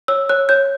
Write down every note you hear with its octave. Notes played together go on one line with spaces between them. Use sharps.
C#5 E6
C#5 F#6
C#5 G6